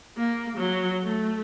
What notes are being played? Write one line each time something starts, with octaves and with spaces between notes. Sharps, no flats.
A#3
F#3
A3